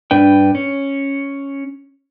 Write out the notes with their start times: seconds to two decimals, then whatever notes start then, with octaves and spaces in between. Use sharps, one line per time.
0.11 G2 D4 B4 G5
0.55 C#4